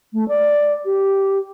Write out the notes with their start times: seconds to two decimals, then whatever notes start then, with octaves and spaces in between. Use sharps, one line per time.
0.13 A3
0.28 D5
0.85 G4